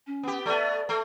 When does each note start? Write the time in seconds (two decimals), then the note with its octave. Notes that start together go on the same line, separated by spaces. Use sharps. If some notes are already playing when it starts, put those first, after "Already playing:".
0.07 C#4
0.23 B3 G4
0.46 A3 B3 D5
0.89 A3